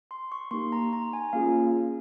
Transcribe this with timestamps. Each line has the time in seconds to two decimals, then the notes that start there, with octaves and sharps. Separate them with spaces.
0.11 C6
0.32 C#6
0.51 A#3 D#4 G4 C6
0.72 A#5
0.93 A#5
1.13 G#5
1.33 A#3 C#4 F4 G#4 F5